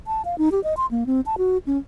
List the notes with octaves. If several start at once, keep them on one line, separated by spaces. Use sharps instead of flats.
A5
F5
D#4
G4
D#5
C6
A#3
C4
A5
F#4
C#4